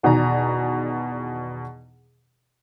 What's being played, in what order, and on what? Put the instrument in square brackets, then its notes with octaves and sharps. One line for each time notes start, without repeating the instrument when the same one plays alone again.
[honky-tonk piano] E2 B2 D#3 D5 G#5 A#5